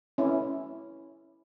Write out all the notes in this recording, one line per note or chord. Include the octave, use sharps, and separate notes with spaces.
C#4 E4